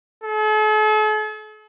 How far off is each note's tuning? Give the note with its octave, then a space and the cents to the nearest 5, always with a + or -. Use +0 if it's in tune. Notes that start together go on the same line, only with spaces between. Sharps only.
A4 -45